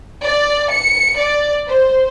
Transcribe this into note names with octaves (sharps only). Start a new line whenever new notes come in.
D5
C#7
D5
C5